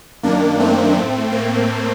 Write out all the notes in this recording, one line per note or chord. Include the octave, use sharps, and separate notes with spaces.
F#2 D#3 A#3 D4
A3 C4
A2
A#3